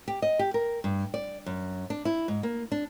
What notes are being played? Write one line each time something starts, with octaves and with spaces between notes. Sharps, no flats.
G4
D#5
G4
A#4
G2
D5
F#2
D4
E4
G#2
A#3
D4